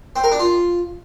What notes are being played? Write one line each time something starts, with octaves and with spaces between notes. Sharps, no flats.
C4
A#4
D4
F4